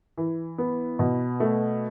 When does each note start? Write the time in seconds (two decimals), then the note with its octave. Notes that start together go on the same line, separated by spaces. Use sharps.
0.18 E3
0.58 B3
0.99 B2
1.40 A3